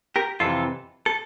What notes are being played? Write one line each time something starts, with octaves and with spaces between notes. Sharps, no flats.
G4 A#4
F2 C3 E3 F4 A4
A4